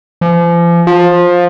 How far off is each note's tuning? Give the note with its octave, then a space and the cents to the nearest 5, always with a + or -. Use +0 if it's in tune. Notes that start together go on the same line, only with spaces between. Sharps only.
F3 -40
F3 +15